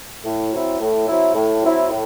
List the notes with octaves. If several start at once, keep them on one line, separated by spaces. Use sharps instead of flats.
A2
F#3 C4 E4
A2
F#3 C4 E4
A2
F#3 C4 E4
A2